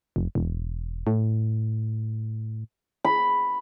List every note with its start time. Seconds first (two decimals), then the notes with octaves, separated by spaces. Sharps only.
0.16 F1
0.35 E1
1.07 A2
3.04 B5